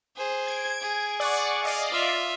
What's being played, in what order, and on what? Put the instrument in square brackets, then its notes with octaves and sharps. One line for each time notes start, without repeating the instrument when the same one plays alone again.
[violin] G#4 C5
[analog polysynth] G#6 D7
[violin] G#4
[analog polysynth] D5 F#5 C#6
D5 D#5 F5
[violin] F4 E5